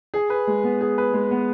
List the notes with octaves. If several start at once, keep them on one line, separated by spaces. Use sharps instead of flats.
G#4
B4
G#3
B3
G#4
B4
G#3
B3